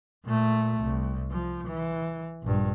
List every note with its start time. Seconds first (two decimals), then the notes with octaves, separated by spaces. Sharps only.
0.25 A#2 A3
0.83 C2
1.30 F3
1.67 E3
2.43 A#1 G2